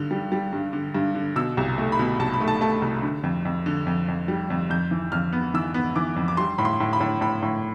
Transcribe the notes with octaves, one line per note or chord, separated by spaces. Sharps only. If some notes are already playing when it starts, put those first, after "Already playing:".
Already playing: G2 D3
G3
G3
G2
D3
G2
D3
B2 E6
C2
A3
B5
B2
C2 A5
B5
A3
A5
A3 A5
C2
D3
F2
F2
D3
F2
F2
G3
F2
F2 G6
E3
F2 F6
B3
E3 E6
B3
E3 D6
F2
D6
G3 C6
A2 B5
C6
A2
B5
A2
A2 B5
A2